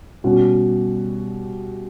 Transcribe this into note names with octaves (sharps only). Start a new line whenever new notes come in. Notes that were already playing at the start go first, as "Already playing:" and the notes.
B2 G3 C#4 F#4